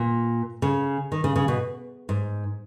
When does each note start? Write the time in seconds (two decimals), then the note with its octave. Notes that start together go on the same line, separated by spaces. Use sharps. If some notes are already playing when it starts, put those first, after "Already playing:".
Already playing: A#2
0.62 C#3
1.12 D#3
1.24 C#3
1.36 C#3
1.48 B2
2.09 G#2